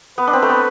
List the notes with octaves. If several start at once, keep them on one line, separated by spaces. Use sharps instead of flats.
B3 B4
D4
C4
A3
B3